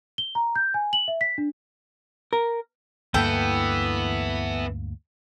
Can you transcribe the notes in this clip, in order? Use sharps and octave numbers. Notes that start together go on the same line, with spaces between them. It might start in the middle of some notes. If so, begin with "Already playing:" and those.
G7
A#5
G6
G#5
F#7
E5
B6
D4
A#4
D2 G2 E3 A#3 B3 A4 G5